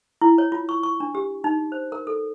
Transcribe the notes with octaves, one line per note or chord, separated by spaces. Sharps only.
E4
C#5
F4
C#6
C#6
D4
G4
D#4
C5
A#4
A4